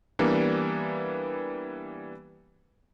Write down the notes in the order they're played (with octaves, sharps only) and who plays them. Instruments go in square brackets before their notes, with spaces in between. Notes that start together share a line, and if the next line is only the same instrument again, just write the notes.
[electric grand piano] E3 G3 A#3 B3 D4